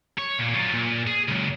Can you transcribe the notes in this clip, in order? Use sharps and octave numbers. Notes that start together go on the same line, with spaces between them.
C#5
A#2
F#3 F4
A#2
G#4
C#2 F#2